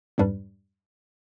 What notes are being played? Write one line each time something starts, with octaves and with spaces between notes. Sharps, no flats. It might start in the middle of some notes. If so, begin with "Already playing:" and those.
F2 G#2 G3 D4 B4